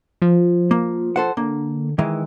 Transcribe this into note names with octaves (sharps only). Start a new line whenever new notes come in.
F3
A#3
A4 C5 F#5
D3 A#3
D#3 E3 G#3